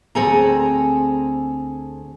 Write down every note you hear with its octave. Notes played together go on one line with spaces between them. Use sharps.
D2 C4 G#4 A4 G#5 A#5